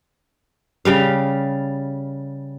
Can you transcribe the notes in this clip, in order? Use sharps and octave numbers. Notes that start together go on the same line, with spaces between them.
C#3 G3 F5